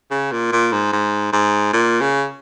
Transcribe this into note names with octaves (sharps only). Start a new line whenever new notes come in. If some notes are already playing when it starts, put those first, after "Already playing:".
C#3
A#2
A#2
G#2
G#2
G#2
A#2
C#3